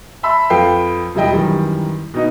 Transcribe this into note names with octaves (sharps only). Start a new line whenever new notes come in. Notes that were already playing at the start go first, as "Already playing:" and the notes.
E5 A5 B5 C6 E6
F2 F4 A4 B4 G5 C7
E1 F3 G3 E4 D#5 G5
F#2 D#3 E3 G3
B2 D#4 D#5